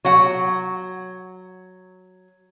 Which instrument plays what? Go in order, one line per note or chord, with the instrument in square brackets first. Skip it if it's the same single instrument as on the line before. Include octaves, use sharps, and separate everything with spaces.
[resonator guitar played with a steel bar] F#3 F#5